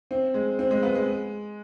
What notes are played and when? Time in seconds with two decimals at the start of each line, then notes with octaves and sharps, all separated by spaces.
0.11 C4
0.34 G#3
0.59 C4
0.71 G#3
0.83 B3
0.95 G#3